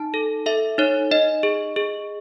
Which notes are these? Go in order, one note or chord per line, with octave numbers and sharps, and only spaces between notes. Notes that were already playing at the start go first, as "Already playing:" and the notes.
Already playing: D#4 A5
A4
A4 E5
D#4 C#5
D#4 D#5
G#4
G#4